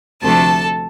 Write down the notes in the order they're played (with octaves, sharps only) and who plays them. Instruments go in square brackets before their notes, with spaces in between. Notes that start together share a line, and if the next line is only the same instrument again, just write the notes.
[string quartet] D2 C3 F3 A3 D4 A4 A5